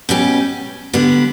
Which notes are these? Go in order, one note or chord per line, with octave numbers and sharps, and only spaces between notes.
B2 G3 C#4 G4
D3 G3 B3